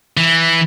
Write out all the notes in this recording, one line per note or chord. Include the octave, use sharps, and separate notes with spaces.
E3